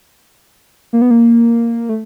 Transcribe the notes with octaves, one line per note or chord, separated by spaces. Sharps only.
A#3
B3
A#3
A3